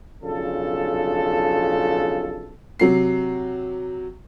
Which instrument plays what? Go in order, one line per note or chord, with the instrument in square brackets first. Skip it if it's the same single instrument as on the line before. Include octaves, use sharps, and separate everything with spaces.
[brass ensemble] B1 C#3 F3 D4 A4
[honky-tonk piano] C3 F#3 C7